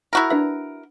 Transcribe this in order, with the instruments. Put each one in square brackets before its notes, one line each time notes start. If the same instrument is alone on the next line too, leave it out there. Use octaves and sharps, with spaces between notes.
[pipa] E4 F#4 A#4
[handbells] D4 B4 E5